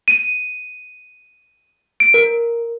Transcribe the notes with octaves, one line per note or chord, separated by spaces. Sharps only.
D#7
D7
A#4